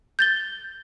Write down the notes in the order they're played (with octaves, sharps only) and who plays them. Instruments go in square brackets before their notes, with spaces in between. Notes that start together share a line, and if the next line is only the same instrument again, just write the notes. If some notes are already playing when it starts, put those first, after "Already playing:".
[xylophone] G6 A6 G7